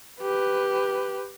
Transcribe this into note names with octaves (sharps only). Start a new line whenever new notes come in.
G4 B4